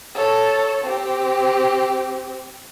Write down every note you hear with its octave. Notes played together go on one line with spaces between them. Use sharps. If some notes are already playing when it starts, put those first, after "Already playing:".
A4 C#5
C4 G4